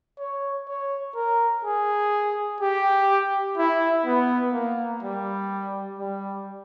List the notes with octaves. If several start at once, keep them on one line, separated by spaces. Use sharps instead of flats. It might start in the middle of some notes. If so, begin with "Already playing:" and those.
C#5
C#5
A#4
G#4
G4
E4
B3
A#3
G3
G3